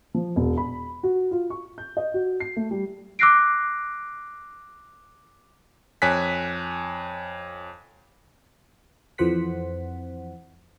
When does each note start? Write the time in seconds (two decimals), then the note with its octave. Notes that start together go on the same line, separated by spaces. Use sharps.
0.14 F3
0.36 E1
0.58 B5
1.03 F#4
1.31 F4
1.50 C#6
1.78 G6
1.97 D#5
2.14 F#4
2.40 C7
2.56 A3
2.71 G3
3.19 D6 E6 F#6 A#6 C7 D7
6.02 F2 C#5 G#5 F#6 B6
9.18 F2 E3 F3 C5 F#5 B6